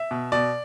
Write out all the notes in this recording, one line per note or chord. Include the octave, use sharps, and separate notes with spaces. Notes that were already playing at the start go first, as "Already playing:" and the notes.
Already playing: E5
B2
B2 D5